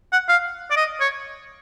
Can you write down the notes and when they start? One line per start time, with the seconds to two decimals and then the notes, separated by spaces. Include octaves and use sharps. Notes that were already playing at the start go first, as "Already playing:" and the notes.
0.13 F#5
0.29 F5
0.71 D5
0.77 D#5
1.01 C#5